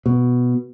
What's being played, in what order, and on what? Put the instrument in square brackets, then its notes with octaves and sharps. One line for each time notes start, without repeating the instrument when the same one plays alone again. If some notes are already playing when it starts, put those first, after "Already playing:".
[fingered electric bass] B2